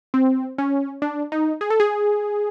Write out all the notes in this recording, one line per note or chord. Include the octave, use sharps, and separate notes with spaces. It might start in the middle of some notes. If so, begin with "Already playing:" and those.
C4
C#4
D4
D#4
G#4
A4
G#4